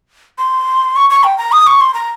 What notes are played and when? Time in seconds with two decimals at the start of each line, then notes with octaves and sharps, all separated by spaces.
0.38 C6
0.96 C#6
1.10 C#6
1.24 G5
1.38 A#5
1.52 D#6
1.67 C#6
1.81 C6
1.94 A#5